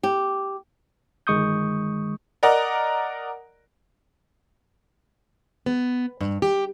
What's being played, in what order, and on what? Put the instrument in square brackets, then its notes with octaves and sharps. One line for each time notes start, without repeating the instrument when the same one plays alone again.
[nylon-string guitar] G4
[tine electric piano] G1 D#3 G#3 C#6 D#6 G6
[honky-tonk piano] A#4 D5 D#5 F#5 A#5
[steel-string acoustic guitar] B3
G2
G4